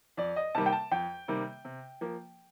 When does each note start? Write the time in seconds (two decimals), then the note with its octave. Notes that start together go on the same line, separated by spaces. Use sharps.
0.17 F2 D5
0.36 D#5
0.55 C3 D#3 G3 A#3 A5
0.66 G5
0.73 A5
0.91 F2 G5
1.28 C3 D#3 G3 A#3
1.65 C3
2.01 F3 A#3